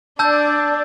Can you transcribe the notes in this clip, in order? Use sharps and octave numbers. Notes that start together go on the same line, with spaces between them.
D4 D5 A5 E6 G6